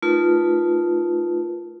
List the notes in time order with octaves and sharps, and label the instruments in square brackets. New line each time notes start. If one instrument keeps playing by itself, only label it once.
[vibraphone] A3 D#4 F4 A#4 B4